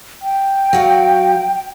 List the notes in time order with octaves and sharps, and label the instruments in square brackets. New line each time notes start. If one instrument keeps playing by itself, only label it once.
[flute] G5
[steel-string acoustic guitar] F#3 F#4 F5